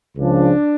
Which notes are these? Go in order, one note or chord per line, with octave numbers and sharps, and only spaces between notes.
C#2 C#3 F3 D4